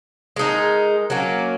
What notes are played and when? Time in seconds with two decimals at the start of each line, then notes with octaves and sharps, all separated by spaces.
0.36 G#3 D#4 A#4
1.10 F#3 A#3 C#4